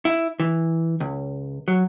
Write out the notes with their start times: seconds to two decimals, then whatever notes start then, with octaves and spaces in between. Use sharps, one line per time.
0.05 E4
0.40 E3
1.00 C#2
1.68 F#3